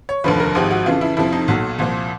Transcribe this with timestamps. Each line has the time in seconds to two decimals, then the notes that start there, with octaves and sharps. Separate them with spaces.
0.09 C#5
0.24 F1 D#2 D3 F3 B4
0.40 A#4
0.55 G#1 G#2 F3 G4
0.71 F#4
0.86 F2 C#3 E3 F4
1.01 E4
1.17 F2 C3 F3 E4
1.33 D#4
1.48 B1 A#2 F#3
1.79 C2 A#2 F3